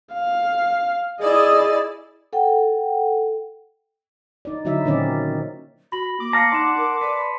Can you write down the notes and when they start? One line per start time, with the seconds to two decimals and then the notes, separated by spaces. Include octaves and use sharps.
0.14 F5
1.21 E4 G#4 D5 D#5 A6
2.33 A4 F#5 G5
4.45 D#4 D5
4.65 D3 F#3 D#4 E4 E5
4.85 A#2 D#3 C4 C#4 D#4 D5
5.92 F#4 B5 A#6 F#7
6.20 A#3 D6
6.33 F5 A5 A#5 C7 C#7
6.52 D#4 D5 F#5 C6 E7
6.77 A#4
7.01 B4 D5